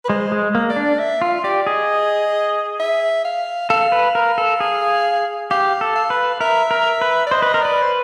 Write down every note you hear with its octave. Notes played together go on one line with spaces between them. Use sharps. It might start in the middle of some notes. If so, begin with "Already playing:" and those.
B4
G#3 C5
G#3
A#3
D5
D4
E5
F4 F5
G4 D5
G#4 D#5
E5
F5
A4 F5
B4
A#4
A4
G#4
G4 F5
A4
F5
B4
A#4 E5
A#4
B4
D5
C5 D#5
B4
A#4
B4 D5
C5